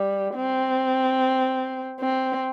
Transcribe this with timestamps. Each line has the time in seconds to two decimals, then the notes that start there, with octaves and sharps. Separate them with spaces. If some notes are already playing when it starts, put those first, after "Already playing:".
Already playing: G3
0.36 C4
2.00 C4